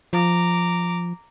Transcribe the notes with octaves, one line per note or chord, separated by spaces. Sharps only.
F3 A#5 D6